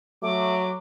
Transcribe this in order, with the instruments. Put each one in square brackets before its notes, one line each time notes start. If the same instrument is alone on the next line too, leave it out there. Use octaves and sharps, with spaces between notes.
[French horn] F#3 [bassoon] A3 [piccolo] D6